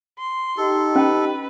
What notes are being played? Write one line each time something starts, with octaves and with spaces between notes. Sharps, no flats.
C6
D#4 G4 A4
C#4 B4 G5